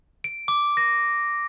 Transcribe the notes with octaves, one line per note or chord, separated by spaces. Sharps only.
D7
D6
A#6